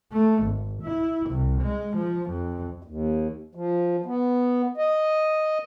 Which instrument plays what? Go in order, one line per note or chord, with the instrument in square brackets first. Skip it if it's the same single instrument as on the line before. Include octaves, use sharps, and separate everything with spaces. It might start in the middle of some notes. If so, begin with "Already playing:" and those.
[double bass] A3
G#1
E4
C2
G#3
F3
F2
[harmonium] D#2
F3
B3
D#5